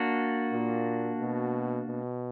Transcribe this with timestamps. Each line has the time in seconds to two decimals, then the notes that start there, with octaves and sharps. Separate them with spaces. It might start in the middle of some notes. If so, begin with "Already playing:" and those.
Already playing: A#3 D4 F#4
0.52 A#2
1.20 B2
1.88 B2